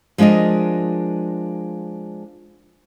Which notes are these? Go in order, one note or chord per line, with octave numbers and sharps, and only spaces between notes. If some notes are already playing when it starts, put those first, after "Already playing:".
F3 G#3 D4 A#4 D#5